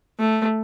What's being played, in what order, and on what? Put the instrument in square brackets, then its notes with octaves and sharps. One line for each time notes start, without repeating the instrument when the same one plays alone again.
[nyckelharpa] A3